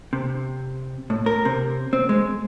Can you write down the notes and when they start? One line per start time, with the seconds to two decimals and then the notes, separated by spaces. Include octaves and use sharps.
0.13 C3
1.10 A2
1.26 A#4
1.45 C3
1.93 C4
2.09 G#3